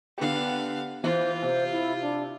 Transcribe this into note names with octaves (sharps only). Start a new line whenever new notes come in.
D3 B3 G4 F5
E3 F4 C5
C3 C5
E4
D4